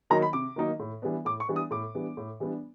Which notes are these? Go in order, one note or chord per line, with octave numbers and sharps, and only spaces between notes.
D#3 F#3 A#3 D#4 A#5
B5
C3 D6
D#3 F#3 A#3 D#4
A2
E3 G3 B3 D4
A2 D6
C#6
E3 G3 B3 D4
D#6
A2 D6
E3 G3 B3 D4
A2
E3 G3 B3 D4